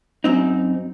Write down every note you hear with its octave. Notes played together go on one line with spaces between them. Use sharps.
F#2 C4 D#4